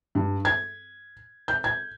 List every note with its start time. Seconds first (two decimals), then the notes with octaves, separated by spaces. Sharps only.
0.15 G2
0.45 G#6
1.48 G6
1.64 G#6